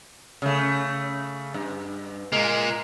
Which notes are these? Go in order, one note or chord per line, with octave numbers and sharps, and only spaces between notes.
C#3 A3
G2
A#2 G#3 A#3